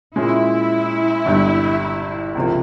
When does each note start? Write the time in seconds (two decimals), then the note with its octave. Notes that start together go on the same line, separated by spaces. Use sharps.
0.16 A#2 G#3 C#4 E4
1.26 G1 G2 G3
2.35 C#2 C3 F3 A#3